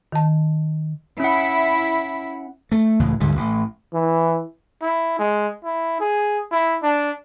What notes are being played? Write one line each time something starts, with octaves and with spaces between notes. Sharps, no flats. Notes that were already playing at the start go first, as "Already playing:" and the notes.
D#3 A5
C#4 E4 F#5
A3
C#2 A2 E3
D2 G#2 D3 G3
A1
E3
E4
G#3
E4
G#4
E4
D4